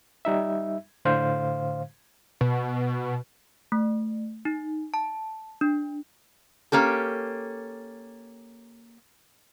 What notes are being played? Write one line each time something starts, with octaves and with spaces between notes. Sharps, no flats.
G3 D#4 E5
A2 D3 C5 F5
B2
A3
D#4
A5
D4
A#3 C#4 G4 A4